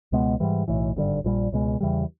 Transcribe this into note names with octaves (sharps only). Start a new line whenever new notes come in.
C#2 B2 G#3 B3
G#2 E3 G3
B1 A2 E3
G#1 G2 D3 G3
A#1 A#2 G3
C#2 B2 G#3
E2 C#3 E3 G3